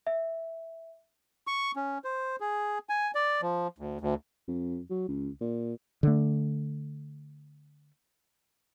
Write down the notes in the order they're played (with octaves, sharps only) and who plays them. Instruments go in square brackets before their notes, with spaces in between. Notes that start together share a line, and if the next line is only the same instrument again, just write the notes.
[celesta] E5
[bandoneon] C#6
C#4
C5
G#4
G#5
D5
F3
D2
D2
[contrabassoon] F2
F#3
C#2
A#2
[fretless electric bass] D3 A3